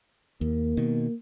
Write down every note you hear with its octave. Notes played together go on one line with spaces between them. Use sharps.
D#2 A#3
B2 D#3